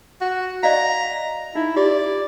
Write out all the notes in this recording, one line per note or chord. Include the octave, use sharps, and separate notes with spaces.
F#4
D5 D#5 F5 A#5
D#4 E4
F4 G4 D5